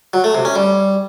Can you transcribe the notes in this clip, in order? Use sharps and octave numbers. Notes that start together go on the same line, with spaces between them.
F#3
A3
C3
C#4
G3